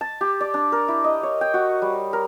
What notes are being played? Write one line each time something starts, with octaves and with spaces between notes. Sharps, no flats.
A5
G4
D5
D4
A#4
E4
D#5
C#5
G5
F#4
G3
A#4